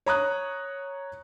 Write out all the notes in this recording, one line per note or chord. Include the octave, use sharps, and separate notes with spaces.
C#5 A#5 D#6 F#6